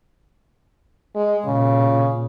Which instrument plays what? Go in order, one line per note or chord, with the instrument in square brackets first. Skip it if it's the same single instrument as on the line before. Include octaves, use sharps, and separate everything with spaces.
[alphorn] G#3
[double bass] A#2 [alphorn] C#3